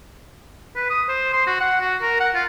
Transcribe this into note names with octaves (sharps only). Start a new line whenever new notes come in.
B4
D#6
C5
C6
F#4
F#5
F#4
A#4
F#5
F4